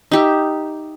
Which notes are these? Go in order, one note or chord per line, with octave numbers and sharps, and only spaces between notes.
D#4 G4 E5